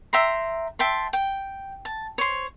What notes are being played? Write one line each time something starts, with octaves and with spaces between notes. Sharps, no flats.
E5 G5 A#5 C6
E5 G5 A5 C6
G5
A5
C5 C#5